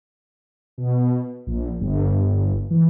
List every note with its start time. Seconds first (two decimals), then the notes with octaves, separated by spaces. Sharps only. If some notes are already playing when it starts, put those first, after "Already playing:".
0.78 B2
1.47 A#1
1.81 G1
2.71 E3